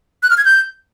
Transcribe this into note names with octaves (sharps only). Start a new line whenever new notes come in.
F#6
F6
G#6
G6